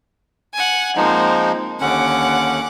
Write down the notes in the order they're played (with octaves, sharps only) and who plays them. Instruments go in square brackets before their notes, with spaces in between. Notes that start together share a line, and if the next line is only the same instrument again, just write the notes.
[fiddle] F#5 G#5
[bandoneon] F3 G#3 D#4 [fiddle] A#3 C4
[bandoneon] D#2 D3 C#4 [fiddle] F#5 D6